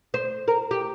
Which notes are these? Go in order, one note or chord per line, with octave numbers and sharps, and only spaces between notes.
C5
A#4
G4